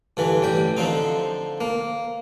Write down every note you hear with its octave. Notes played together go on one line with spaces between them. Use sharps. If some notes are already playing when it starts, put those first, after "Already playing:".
G2 D3 E3
A1 G3 G5
D3 F3 C4 D#4
A#3